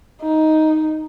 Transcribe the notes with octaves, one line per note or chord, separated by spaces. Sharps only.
D#4